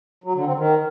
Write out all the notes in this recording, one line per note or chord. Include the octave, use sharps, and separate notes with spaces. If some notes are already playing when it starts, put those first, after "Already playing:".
F#3
D3
C4
D#3